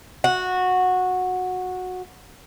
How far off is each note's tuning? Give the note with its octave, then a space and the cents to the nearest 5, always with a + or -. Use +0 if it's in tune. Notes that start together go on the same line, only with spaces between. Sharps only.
F#4 -15